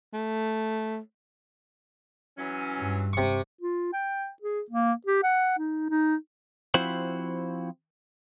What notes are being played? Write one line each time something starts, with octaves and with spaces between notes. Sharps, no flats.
A3
E3 F#3 C#4
G2
C3 C#6
F4
G5
G#4
A#3
G4
F#5
D#4
D#4
F3 C4 E4 F#4 C5 B5